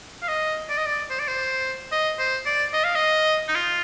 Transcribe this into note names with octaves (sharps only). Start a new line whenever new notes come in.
F5
D#5
D5
D#5
D5
C5
D5
C5
D#5
C5
D5
D#5
F5
D#5
D#4
F4